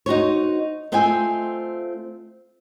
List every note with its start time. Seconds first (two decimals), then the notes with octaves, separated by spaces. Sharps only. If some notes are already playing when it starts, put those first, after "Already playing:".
0.06 D#4 F#4 C5 C#5
0.92 A3 C4 F4 D#5 G5 G#5